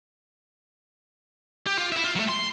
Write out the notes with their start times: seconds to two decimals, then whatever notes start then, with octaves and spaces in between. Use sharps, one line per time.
1.67 G4
1.78 F4
1.92 E4 E5
2.04 F4
2.16 F#3 A3
2.29 C6